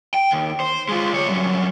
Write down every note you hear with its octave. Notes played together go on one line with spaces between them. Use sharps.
G5
D#2
C5
G#3 F4
D2 C#5
G2 F#3